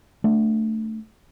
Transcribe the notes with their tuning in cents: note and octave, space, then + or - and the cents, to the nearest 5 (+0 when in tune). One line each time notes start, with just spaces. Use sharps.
A3 +5 D4 +0